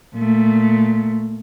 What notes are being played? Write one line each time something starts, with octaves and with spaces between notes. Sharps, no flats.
A#2 A3